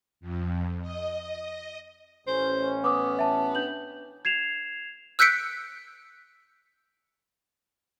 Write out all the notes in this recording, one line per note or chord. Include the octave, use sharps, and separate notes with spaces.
F2
D#5
A1 C#4 C5
B3 D6 D#6
E5 A5
D4 G6 F#7
G#6 C7 E7 F7
E6 F#6 G6 B6 C#7 D7